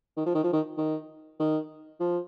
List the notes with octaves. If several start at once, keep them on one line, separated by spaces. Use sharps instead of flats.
D#3
F3
D#3
F3
D#3
D#3
D#3
F3